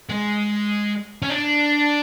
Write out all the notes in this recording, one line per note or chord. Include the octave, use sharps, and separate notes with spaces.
G#3
C#4
D4